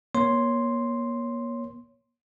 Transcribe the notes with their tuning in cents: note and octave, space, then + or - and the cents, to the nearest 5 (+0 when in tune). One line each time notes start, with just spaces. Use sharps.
A#3 +35 C#5 +0 C6 +0